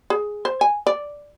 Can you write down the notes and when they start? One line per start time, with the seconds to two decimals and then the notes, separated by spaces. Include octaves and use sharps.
0.10 G#4
0.45 C5
0.61 G#5
0.87 D5